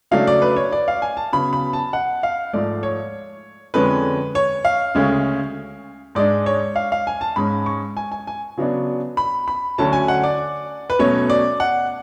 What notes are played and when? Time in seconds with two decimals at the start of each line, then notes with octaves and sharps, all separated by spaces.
0.11 C#3 F#3 A3 D4 F5
0.27 D5
0.42 B4
0.56 C#5
0.72 D5
0.88 F5
1.02 G#5
1.17 A5
1.33 C#3 F#3 B3 B5
1.53 B5
1.73 A5
1.93 F#5
2.23 F5
2.53 G#2 F3 A3 D5
2.83 C#5
3.74 F2 D3 G#3 C#4 B4
4.35 C#5
4.65 F5
4.95 D2 C#3 G#3 C#4
6.15 G#2 G#3 D4 D5
6.46 C#5
6.76 F5
6.92 F5
7.07 G#5
7.21 A5
7.36 G#2 G#3 C#4 B5
7.66 C#6
7.97 G#5
8.12 G#5
8.27 G#5
8.57 C#3 F#3 B3 D4
9.17 B5
9.48 B5
9.78 D2 D3 F#3 C#4 A5
9.93 G#5
10.08 F#5
10.24 D5
10.90 B4
10.99 B2 F#3 A3 C#4 C#5
11.30 D5
11.60 F#5